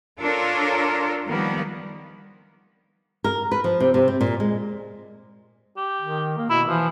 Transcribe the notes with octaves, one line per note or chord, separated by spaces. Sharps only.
D4 F4 A4 A#4 C#5
D#3 F3 G3 A#3 B3
A#4
B4
F3
C3
C3
C4
A#2
G#3
G4
D#3
A#3
B2 E4
E3 F3